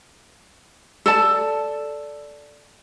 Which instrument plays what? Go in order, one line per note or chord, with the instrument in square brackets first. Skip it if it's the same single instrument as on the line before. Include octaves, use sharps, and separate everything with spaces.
[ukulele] A4 D5 A5